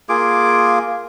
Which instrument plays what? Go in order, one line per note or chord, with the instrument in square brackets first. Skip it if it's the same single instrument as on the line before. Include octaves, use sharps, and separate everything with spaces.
[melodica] A#3 F4 G#4 D6